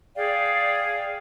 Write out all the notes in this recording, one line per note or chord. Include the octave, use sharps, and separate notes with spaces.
G#4 D5 F5 G5